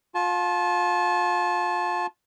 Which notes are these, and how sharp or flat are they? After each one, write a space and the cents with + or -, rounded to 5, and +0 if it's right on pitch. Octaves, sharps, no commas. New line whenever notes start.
F4 +30 A5 -25